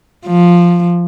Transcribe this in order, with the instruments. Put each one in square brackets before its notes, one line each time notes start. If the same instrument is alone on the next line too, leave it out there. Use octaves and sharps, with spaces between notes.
[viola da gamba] F3